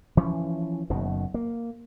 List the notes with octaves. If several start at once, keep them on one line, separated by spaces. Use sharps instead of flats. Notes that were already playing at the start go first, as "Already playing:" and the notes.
E3 F3 C#4
F#1 F#2 B2 D#3
A#3